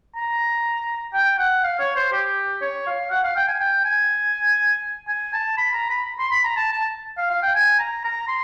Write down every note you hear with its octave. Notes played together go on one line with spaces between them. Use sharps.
A#5
G5
F#5
F5
C#5
C5
G4
C#5
F5
F#5
F5
G5
G#5
G5
G#5
G#5
A5
B5
A#5
B5
C6
B5
A#5
A5
A5
F5
F5
G5
G#5
A#5
A#5
C6